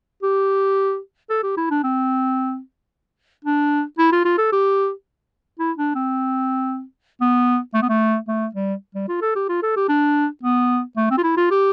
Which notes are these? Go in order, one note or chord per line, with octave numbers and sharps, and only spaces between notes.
G4
A4
G4
E4
D4
C4
D4
E4
F4
F4
A4
G4
E4
D4
C4
B3
A3
B3
A3
A3
G3
G3
F4
A4
G4
F4
A4
G4
D4
B3
A3
C4
F4
E4
F4
G4